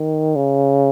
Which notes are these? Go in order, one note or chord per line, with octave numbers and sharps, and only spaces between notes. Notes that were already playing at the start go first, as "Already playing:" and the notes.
Already playing: D#3
C#3